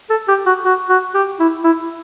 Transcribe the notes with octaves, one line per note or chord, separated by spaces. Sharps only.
A4
G4
F#4
F#4
F#4
G4
E4
E4